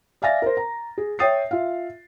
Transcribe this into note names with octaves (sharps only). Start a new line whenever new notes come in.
D5 E5 F5 G#5 A6 A#6
A#4 C5
A#5
G#4
C#5 E5 G5 D#6 A6 C7
F4 E5 F5